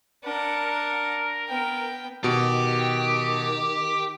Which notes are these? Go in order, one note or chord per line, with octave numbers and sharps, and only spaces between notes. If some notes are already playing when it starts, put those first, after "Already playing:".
D4 A#4 F#5
B3 G5
B2 D#3 G4